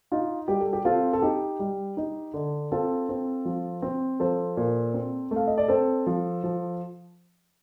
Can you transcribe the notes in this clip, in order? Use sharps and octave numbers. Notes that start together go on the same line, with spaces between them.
D#4 F4
G3 G4
A4
G4
C4 F4 A4
A4
D#4 G4
G3
D#4
D3
C4 F4 A4
C4
F3
C4
F3 A4 C5
A#2
C4
A3
F5
D#5
D5
C4 A4 C5
F3
F3